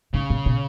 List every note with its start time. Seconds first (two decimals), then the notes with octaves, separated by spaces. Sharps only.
0.13 G#2 C#3
0.30 A2
0.46 B2